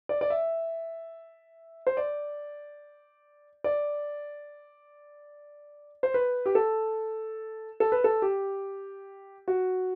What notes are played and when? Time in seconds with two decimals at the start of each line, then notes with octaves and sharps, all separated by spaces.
0.09 D5
0.21 D5
0.30 E5
1.87 C5
1.97 D5
3.64 D5
6.03 C5
6.14 B4
6.46 G4
6.55 A4
7.80 A4
7.92 B4
8.04 A4
8.22 G4
9.48 F#4